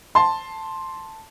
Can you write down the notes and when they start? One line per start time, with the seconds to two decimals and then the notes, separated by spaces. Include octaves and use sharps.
0.15 A5 C6